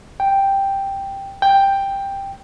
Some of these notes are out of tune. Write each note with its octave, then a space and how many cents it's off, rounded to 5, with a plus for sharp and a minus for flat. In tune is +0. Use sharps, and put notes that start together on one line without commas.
G5 +0
G5 +5